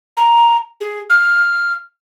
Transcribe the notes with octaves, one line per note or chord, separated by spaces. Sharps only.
A#5
G#4
F6